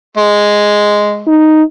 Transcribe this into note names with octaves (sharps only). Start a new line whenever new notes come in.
G#3
D#4